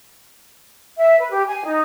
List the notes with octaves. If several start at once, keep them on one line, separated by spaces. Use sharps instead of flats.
E5
B4
G4
G#5
D#4